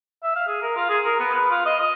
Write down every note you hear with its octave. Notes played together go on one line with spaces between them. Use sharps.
E5
F5
G#4
A#4
F4
G#4
A#4
B3
B4
F4
D#5
D#5